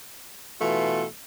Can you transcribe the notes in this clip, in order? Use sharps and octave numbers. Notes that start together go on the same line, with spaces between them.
B2 E3 A3 F4